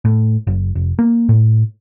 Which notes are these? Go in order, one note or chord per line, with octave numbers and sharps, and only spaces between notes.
A2
F#1
F1
A#3
A2